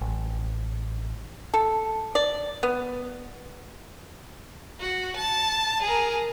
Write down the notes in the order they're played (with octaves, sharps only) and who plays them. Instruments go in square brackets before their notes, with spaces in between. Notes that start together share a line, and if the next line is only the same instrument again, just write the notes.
[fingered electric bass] A1
[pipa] A4
D5
B3
[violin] F#4
A5
G#4 A#4